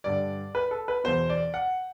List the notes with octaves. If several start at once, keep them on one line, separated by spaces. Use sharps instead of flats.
G2 D3 D5
B4
A4
B4
E2 B2 C5
D5
F#5